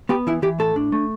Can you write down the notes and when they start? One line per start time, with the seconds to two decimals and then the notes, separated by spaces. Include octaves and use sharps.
0.09 B3 G4
0.27 E3 E4
0.42 E3 G4
0.59 A2 A4
0.76 D4
0.92 A3